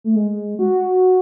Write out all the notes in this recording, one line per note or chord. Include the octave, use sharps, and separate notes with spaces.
A3
G#3
F#4